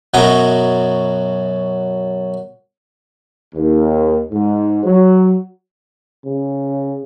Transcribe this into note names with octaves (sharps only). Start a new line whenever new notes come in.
F#2 B2 F#3 D#5 A#5
D#2
G#2
F#3
C#3